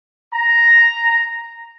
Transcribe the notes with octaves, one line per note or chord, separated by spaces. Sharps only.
A#5